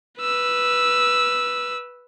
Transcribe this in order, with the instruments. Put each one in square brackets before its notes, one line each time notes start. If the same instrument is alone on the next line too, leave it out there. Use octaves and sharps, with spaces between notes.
[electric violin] B4 E6